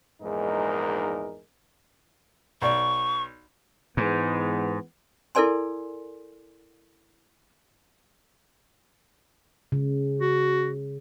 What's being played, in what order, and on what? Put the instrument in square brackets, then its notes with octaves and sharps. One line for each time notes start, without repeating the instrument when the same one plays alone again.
[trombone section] A#1 E2 G#2 G#3 D#4 A#4
[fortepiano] B1 D5 [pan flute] C#6
[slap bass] G#2 [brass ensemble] E3 G#3 B3
[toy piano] E4 A4 A#4 D5 G#5 C6
[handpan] C#3
[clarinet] F#4